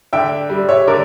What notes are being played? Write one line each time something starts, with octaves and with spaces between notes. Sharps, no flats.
D3 E5 G5
G3
C#5 E5
D3 A#4 D5